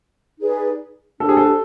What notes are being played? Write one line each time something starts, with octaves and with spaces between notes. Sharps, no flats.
D#4 G#4 B4 D5
D4 G4 A4 C5
G#4
A4